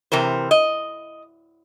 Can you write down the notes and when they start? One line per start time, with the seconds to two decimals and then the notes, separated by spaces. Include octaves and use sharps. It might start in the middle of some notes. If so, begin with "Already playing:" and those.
0.12 C3 E3 A#4 C5
0.51 D#5